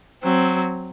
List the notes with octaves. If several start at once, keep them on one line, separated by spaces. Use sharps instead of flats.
F#3 C4